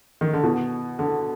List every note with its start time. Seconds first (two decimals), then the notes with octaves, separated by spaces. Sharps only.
0.21 D#3
0.33 D3
0.44 B2
0.99 D3